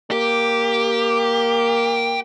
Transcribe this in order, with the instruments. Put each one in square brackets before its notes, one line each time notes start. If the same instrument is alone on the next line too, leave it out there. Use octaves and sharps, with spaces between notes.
[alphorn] A#3 [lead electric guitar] G4